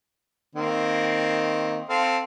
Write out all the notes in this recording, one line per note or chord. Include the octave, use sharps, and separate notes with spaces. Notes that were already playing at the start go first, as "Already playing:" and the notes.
D#3 A#3 C4
C4 A4 F5